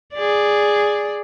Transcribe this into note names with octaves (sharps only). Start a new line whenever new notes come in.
G#4 D5